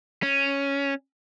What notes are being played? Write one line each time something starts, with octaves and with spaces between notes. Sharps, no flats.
C#4